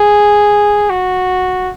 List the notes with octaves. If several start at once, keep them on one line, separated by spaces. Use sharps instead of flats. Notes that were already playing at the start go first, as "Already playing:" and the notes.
Already playing: G#4
F#4